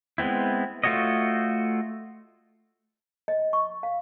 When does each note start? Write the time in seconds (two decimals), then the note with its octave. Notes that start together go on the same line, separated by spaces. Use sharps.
0.18 G#3 B3 C4 E4
0.84 A3 F4 F#4 C#5 D#5
3.28 D#5
3.53 C#6
3.83 F5